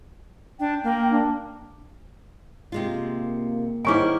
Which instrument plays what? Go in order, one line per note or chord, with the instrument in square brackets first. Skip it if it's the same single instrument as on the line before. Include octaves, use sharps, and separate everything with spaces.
[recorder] D4 [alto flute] G5
[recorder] A#3
[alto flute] D4
[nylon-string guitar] C3 G#3 F4 [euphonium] A#3
[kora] G#2 C#4 D#4 [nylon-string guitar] D#3 E4 [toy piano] G#5 C#6 D6